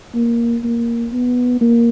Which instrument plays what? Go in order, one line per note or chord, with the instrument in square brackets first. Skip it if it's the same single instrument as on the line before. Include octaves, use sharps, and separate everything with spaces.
[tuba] A#3
A#3
B3
A#3